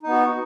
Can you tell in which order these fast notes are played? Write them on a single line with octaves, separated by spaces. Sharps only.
D#4 B3 F#4